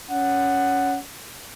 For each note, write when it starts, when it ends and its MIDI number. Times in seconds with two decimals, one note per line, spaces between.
0.11 1.00 61
0.11 0.97 78